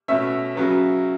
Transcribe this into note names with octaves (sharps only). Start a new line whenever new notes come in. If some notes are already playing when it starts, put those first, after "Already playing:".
B2 A3 C#4 E5
C#3 F#3 B3